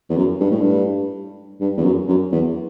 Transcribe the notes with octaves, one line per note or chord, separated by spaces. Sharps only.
E2
F#2
G2
A2
G2
G2
E2
F#2
F#2
E2